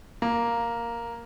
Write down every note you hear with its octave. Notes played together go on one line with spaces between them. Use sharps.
A#3